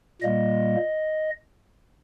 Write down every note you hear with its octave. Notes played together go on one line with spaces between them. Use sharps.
A#2 G3 A#3 D#5